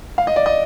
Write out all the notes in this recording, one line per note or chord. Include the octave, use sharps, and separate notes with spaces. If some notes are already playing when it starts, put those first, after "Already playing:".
F5
D#5
D5
D#5